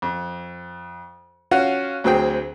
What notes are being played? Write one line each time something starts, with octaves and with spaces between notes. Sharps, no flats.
F2
C#4 F4 F#4 F5 F#5
D2 F#3 C4 G#4 G5